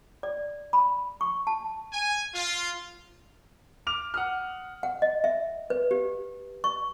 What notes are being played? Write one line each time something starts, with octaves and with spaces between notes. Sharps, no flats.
D5
B5
C#6
A5
G#5
F4
D6 F6 F7
F#5 D#6 F6
F#5
D#5
E5
B4
G4
C#6